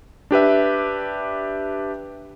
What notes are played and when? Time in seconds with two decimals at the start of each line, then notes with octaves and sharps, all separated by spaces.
0.31 D4 G4 B4 E5